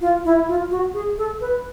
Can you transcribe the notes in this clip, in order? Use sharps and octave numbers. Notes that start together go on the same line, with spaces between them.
F4
E4
F4
F#4
G#4
A4
B4